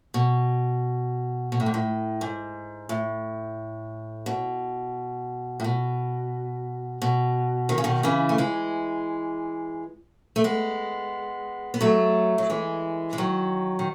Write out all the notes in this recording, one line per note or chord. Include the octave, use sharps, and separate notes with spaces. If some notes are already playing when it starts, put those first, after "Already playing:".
B2
B2
A2
G#2
A2
G#2
A2
B2
A2
B2
B2
D#3
C#3
B2 D#3
C#3 E3
A3
E3 G#3
A3
G#3 B3
B3
F#3 A3
F#3
E3 G#3
G#3
D#3 F#3
D#3